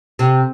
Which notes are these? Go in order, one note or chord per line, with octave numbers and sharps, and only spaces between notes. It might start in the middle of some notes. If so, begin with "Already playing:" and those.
C3